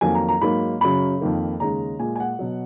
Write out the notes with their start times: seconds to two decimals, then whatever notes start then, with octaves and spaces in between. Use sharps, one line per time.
0.01 F2 D#3 F#3 A#3 G#5
0.15 A#5
0.29 A#5
0.41 G#2 F#3 A#3 B5
0.81 F#2 C#3 F#3 B5
1.21 F2 D#3 A#3
1.60 D#2 C#3 G#3 A#5
1.99 A#2 G#3 G#5
2.16 G#5
2.20 F#5
2.39 B2 F#3